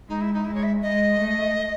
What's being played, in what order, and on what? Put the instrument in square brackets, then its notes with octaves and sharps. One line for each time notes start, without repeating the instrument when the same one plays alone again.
[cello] G#3 [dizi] D#4
[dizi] E4
D#4
[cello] G#3 [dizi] E4
[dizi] C#5
E5
[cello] G#3 [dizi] D#5
[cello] A3